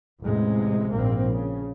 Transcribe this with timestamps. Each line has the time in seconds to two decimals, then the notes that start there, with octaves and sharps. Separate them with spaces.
0.23 A1 E2 C3 G#3
0.93 A#1 G#2 A#3 C4
1.30 C#3